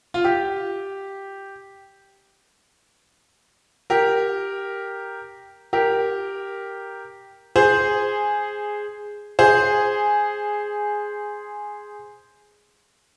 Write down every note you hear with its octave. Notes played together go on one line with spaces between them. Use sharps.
F4
G4
G4 A#4
G4 A#4
G#4 C5
G#4 C5